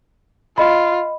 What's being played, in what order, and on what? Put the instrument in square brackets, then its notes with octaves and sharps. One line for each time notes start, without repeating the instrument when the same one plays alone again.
[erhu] F4 [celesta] D#5 B5